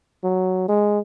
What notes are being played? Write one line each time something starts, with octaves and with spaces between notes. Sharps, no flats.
F#3
G#3